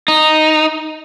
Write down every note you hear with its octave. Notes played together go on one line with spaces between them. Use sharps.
D#4